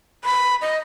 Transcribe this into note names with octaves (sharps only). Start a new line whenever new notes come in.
B5
D#5